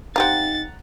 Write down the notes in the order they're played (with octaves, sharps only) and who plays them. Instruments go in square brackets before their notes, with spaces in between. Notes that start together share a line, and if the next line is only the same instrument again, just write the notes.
[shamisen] C4 G4 F5 [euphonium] D#4 [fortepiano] F#5 A#5 [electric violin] A6